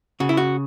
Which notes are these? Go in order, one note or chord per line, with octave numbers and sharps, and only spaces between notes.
C#3 F#4
E4
F#4